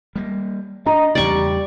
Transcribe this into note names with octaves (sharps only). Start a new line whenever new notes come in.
G3 A#3
D4 D#5 A#5
E2 C#3 G3 D5 C#6